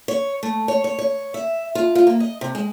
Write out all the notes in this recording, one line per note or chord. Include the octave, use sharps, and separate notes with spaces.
C#5
A3
C#5
C#5
C#5
E5
F4
F4
A#3
D#5
C3
G#3